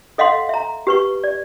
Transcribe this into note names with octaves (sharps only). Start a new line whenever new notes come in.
A4 D#5 F5 F#5 C6
E5 A#5
G4 B4 C#6
D5